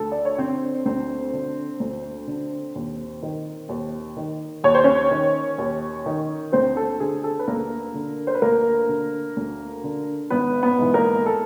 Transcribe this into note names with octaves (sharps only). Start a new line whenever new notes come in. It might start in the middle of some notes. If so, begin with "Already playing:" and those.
Already playing: D2 A4
D5
C#5
D3 C4 C5
D2 C4 C5
D3
D2
D3
D#2
D#3
D#2
D#3
D#2 C#5
C5
C#4 C#5
D#3
D#2
D#3
D2 C4 C5
A4
D3 G#4
A4
B4
D2 A#3 A#4
D3
C5
B4
D2 A#3 A#4
D3
D2
D3
G#1 B3 B4
B3 B4
G#2 E3
A#3 A#4
A4